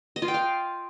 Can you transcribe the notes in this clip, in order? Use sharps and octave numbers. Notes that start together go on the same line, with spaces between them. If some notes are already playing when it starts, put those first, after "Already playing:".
D#5
F4
G5
F5